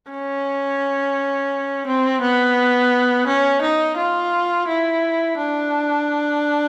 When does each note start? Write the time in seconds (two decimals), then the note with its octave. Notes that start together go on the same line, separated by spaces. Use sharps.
0.11 C#4
1.87 C4
2.21 B3
3.27 C#4
3.62 D#4
3.97 F4
4.68 E4
5.38 D4